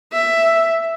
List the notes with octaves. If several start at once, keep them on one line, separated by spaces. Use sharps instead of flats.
E5